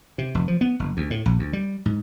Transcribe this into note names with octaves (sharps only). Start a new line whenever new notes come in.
C3
F1
F3
B3
F#1
D2
A2
A#1
D2
G3
G#2